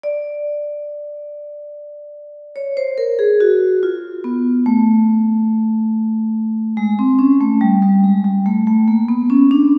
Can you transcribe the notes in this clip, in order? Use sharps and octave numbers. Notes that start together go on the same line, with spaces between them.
D5
C#5
C5
A#4
G#4
F#4
F4
B3
A3
G#3
C4
C#4
A3
G3
G3
G#3
G3
A3
A3
A#3
B3
C#4
D4